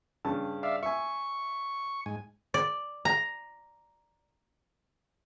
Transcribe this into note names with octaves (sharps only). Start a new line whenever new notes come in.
G2 C#3 A5
D5 E5 F5
E5 G#5 C#6
G#2 G#5
D5
A#5